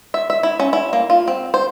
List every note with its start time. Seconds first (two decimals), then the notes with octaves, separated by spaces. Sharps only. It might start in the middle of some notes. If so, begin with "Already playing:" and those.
0.14 E5
0.30 E5
0.43 E4
0.60 C#4
0.73 E4
0.93 A#3
1.10 F4
1.28 C4
1.54 C5